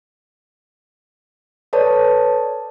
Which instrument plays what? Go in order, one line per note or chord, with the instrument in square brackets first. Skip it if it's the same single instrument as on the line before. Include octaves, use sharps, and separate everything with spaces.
[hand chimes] A4 B4 C#5 D5 A5